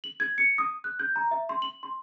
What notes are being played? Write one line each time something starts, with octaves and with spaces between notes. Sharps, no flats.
F#7
G#6
C#7
D#6
F#6
G6
A#5
E5
C6
F#7
C6